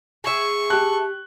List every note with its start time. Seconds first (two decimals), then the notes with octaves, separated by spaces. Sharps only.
0.24 G#4 E5 C#6
0.70 G4 A5 F#6